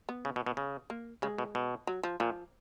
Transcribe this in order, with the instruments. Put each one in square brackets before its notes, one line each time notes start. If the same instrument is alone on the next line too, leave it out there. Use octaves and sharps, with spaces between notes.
[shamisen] B3
[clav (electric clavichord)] C#3
B2
B2
C#3
[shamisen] A#3
[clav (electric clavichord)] C#3 [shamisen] G#3
[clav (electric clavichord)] B2
B2
[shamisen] F#3
F3
[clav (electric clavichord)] A#2 [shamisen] F3